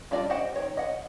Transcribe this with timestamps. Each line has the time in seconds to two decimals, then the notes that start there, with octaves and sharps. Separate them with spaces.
0.11 G3 D4 F4 D5 D#5
0.29 F#4 G4 C5 D#5 F#5
0.56 D#3 C#5
0.77 D#5 F#5